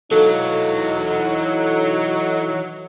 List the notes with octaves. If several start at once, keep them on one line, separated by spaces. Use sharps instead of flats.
E3 F#3 D#4 F#4 A4